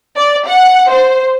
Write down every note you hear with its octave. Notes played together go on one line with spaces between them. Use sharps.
D5
F#5
C5